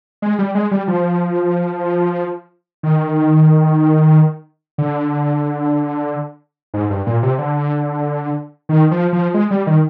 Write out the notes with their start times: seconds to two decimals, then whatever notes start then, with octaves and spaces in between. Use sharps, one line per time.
0.22 G#3
0.39 G3
0.55 G#3
0.71 G3
0.88 F3
2.83 D#3
4.78 D3
6.74 G#2
6.90 G2
7.06 A#2
7.23 C3
7.38 D3
8.69 D#3
8.91 F3
9.13 F3
9.34 G#3
9.51 G3
9.67 D#3